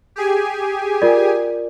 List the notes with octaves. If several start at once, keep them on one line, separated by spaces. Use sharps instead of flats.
G4 G#4 G#5
F4 A#4 D5